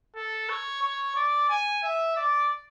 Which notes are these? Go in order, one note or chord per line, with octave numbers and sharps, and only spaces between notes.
A4
C#5
C#5
D5
G#5
E5
D5